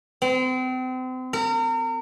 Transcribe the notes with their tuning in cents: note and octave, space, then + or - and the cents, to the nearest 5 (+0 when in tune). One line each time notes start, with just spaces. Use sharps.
C4 -35
A#4 -35